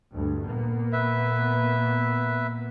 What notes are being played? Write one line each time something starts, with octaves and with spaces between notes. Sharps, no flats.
D2 G2
A#2 A#3 B3
B4 E5